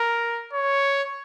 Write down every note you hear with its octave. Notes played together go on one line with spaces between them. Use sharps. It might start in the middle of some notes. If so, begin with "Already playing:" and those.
Already playing: A#4
C#5